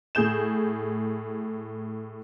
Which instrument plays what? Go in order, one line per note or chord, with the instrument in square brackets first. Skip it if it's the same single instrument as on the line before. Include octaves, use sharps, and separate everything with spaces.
[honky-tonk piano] A2 G#4 G6 E7